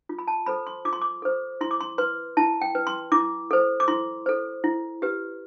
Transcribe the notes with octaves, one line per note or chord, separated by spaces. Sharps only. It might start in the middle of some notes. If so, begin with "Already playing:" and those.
F4
B5
A5
A4 C5 B5
C6
F4 D6
C6
D6
A4 C5
E4 C6
D6
C6
B4 C6
E4 A5
G5
B4
C6
E4 D6
A4 C5
D6
E4 C6
A4 C5
E4
G4 B4